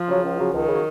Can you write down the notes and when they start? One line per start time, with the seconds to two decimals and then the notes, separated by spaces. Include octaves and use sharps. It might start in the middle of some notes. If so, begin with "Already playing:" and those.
Already playing: F3
0.09 C#3 F#3
0.24 C#2
0.39 C#3 F#3
0.54 C#2 D#3
0.69 C#3 F#3